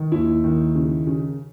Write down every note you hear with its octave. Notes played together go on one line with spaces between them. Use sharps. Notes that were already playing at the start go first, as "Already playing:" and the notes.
Already playing: D#3
D#2 E4
D#3
C#3
C#3